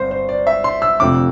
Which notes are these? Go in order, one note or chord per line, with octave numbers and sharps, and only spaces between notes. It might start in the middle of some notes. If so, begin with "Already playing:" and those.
Already playing: G1 G2 C4 C5
C5
D5
E5
C6
E6
F1 F2 D3 D6